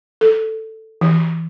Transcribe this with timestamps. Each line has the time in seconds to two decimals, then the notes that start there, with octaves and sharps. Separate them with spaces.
0.21 A4
1.01 E3